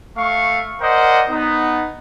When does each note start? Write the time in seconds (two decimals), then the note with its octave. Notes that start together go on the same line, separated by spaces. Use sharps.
0.17 A3 F5 C#6
0.81 A#4 C5 D5 D#5 F#5
1.29 B3 D#4